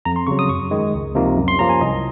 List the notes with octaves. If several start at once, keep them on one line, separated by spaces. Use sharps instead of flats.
F2 A#5
C6
C#3 F#3 C#6
D#6
F#2 C#6
D#3 G#3
C#2
C3 F3 A#3 D#4
F#2
C6
F3 A#3 C#4 A#5
G#5
C2 D#5